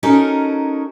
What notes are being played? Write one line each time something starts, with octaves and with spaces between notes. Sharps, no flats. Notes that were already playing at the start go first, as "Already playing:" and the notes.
C#4 D#4 F#4 A4 A#4 D#5